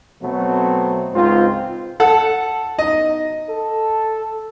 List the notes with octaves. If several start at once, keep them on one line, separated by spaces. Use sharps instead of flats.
B2 F#3 A3 B3 C4
C#2 G#2 C4 F4
A4 F#5
B2 D#4 D#5
A4